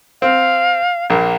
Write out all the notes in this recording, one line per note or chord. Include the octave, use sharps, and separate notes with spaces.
C4 F5
A#1 A#3